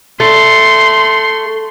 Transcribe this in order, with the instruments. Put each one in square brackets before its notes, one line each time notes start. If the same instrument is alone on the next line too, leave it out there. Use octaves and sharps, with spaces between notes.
[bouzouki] A3 [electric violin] C6